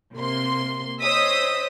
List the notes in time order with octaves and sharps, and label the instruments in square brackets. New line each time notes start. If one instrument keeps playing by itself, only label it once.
[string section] C3 A#3 C6
C5 C#5 D#5 D#6 E6 B6